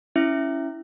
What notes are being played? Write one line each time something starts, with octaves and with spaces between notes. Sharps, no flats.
C#4 E4 E5